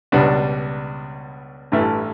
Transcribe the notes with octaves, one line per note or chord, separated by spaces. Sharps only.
C#2 B2 G3 B3 D4
A1 G2 E3 A3 E4